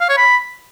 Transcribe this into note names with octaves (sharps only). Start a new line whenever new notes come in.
F5
C#5
B5